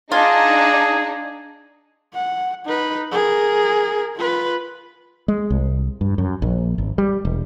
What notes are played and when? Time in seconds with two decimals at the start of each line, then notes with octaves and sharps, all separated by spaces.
0.12 D4 D#4 F4 G#4
2.14 F#5
2.65 D#4 B4
3.12 G#4 A#4
4.16 F4 B4
5.28 G#3
5.50 C2
6.01 G2
6.18 F#2
6.42 A#1
6.78 G#1
6.98 G3
7.25 E1